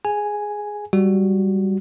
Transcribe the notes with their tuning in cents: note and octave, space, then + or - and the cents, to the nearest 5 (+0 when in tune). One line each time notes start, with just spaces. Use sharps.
G#4 +0 G#5 +0
G3 +0 F#4 +0